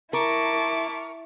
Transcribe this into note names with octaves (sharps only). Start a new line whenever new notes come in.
E4 A#4 A5 C#6 D6